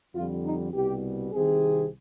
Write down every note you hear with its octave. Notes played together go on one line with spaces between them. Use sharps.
F2 D3 G3 F4
D#4
C2 B2 G3 G4
C2 C3 D#3 G#4